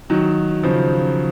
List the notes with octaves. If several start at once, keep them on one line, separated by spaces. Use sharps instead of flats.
D#3 F#3
C#3 F3